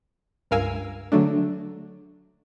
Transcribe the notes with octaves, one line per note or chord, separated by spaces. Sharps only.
C#2 G2 A#4 F5 G#5 E6
D3 F#3 A3 D4